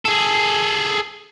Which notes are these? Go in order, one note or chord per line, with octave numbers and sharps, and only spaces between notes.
G#4 A4